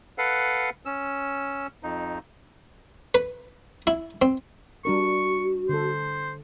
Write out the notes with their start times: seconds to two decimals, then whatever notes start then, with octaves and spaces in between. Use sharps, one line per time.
0.18 A4 B4 F5 F#5
0.85 C#4 E6
1.83 F2 D#4
3.15 B4
3.87 E4
4.22 C4
4.85 G3 D4 F#4 A#4 C#6
5.69 D3 A4 C5